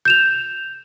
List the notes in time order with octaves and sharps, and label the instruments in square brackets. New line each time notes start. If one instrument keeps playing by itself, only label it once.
[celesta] G6 E7 F7